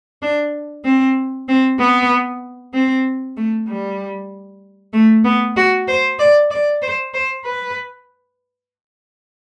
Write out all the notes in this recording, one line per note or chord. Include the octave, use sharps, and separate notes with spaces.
D4
C4
C4
B3
C4
A3
G3
A3
B3
F#4
C5
D5
D5
C5
C5
B4